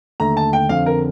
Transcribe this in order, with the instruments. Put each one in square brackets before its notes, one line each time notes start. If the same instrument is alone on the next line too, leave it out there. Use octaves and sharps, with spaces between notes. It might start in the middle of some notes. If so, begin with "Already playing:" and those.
[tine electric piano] D#2 D3 A3 [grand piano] A#5
[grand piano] A5
G5
[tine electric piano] F2 D3 F3 C4 [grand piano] F5
[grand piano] A#4